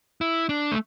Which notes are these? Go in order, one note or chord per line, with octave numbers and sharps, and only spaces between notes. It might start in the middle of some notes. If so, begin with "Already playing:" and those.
E4
D4
A3